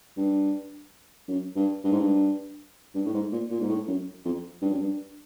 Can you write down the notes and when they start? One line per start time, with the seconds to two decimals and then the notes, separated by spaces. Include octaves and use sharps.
0.17 G2
1.28 F#2
1.56 G2
1.84 G2
1.92 G#2
2.00 G2
2.95 G2
3.06 A2
3.14 G#2
3.32 A#2
3.51 A#2
3.61 G#2
3.69 A2
3.88 F#2
4.25 F2
4.62 G2
4.70 F#2
4.78 G2